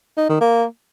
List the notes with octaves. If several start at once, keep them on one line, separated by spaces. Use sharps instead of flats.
D#4
D#3
A#3